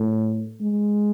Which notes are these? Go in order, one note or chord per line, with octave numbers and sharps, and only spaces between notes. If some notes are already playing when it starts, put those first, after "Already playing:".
Already playing: A2
G#3